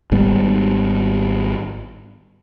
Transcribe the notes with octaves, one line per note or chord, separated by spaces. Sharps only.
G#1 G#2 G3 B3